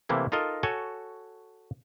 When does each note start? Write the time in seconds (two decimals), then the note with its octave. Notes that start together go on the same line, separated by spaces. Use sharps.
0.09 C3 E3 A3 A#3 E4
0.32 D#4 F4 A4 A#4 D#5
0.63 F#4 A4 C#5 G#5